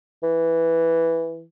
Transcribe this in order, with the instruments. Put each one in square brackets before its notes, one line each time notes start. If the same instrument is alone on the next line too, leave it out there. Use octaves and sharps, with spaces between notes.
[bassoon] E3